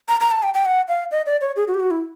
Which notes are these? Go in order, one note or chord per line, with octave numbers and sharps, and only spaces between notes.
A#5
A#5
A5
G5
G5
F#5
F5
D#5
D5
C#5
G#4
F#4
G4
F#4
E4